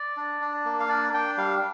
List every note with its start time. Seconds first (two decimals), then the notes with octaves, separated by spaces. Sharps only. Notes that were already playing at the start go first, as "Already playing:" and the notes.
Already playing: D5
0.17 D4
0.41 D4
0.65 A#3
0.80 F5
0.89 D4 D5
1.14 D4 G5
1.37 G3 F5